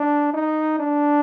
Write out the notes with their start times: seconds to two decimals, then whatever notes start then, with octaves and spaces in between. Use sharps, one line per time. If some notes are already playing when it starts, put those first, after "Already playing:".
Already playing: D4
0.34 D#4
0.79 D4